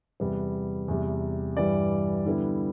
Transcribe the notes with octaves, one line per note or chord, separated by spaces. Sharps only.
E2 C3 G3 B3
E2 C3 G3
G2 E3 G3 D5
D3 G3 B3 E4